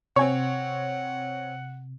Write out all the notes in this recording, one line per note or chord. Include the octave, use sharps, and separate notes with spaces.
C3 C4 C#5 F#5 G#5 C#6